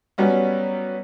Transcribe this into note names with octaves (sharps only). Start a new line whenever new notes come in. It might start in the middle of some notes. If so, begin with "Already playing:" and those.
F#3 G3 B3 C#4